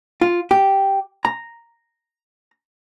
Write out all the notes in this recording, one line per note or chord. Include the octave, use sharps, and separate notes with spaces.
F4
G4
A#5